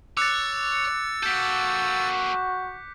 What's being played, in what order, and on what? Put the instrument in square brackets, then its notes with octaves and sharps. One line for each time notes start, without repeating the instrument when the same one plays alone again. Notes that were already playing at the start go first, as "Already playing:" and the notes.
[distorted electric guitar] C#5 [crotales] D6 F#6 C#7 [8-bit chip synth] E6 A6
[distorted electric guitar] A#3 A4 [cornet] F#4 [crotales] G6 B6